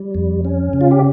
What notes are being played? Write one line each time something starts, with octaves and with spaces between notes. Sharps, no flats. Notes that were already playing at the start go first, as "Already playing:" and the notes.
Already playing: G3
F2
C#4
C#3
F4
G4